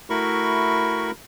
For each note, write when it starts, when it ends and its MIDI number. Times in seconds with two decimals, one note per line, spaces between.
0.10 1.11 57
0.10 1.11 64
0.10 1.11 66
0.10 1.11 70
0.10 1.11 83
0.10 1.11 85